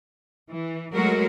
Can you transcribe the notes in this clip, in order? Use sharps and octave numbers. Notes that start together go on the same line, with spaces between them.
E3
F#3 G#3 A3 F#4 A#4